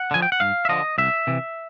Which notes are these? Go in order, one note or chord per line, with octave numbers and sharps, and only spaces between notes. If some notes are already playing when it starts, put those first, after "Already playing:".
Already playing: F#5
D3 F3 G#5
G5
F#5
G2 F5
E5
D3 F3 D#5
C2 E5
C3 E3